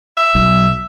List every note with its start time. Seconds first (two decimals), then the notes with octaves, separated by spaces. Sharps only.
0.17 E5
0.35 B1